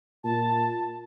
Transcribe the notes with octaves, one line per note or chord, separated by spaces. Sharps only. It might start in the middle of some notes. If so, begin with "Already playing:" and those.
A#2 A5